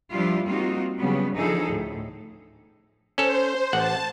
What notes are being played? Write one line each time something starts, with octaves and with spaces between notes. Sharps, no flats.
F3 G3 D4 E4 F4
G3 A#3 C4 D#4 F4 F#4
C#3 F#3 G3 B3
D3 E3 F3 D#4 G#4 A4
D2 A2
C#4 A4 C5
A1 F#5 A5